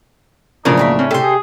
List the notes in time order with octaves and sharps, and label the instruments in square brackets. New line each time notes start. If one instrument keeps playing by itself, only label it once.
[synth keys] B1 F3 A#3 [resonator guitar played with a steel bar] A2 C#3 D4 [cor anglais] D#4
[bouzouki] E5 G#5 A#5
[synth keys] C4 [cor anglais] C#4
[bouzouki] C3 G4 [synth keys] A4 C6
[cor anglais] G#4